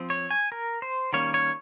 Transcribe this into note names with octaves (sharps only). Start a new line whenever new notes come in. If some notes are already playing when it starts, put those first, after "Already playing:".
Already playing: F3 C4
C#5
G#5
A#4
C5
D#3 G3 A#3 C#4 C#5
C#5